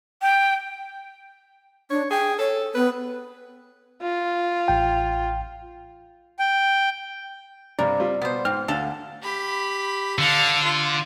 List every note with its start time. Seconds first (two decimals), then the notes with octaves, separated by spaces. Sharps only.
0.22 G5
1.90 D4 C#5
2.10 G#4 G5
2.39 A4 C#5
2.75 B3 B4
4.02 F4
4.68 A1 G5
6.39 G5
7.79 G2 C3 A#4 D5
8.00 G3 C4 F4
8.22 B2 B3 C5
8.45 G#2 C4 F6
8.68 D2 D3 A4 F5
9.22 G4 B5
10.19 D3 F5 A5
10.64 F4